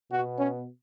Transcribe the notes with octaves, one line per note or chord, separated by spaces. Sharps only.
B2 B3 F#4
C#4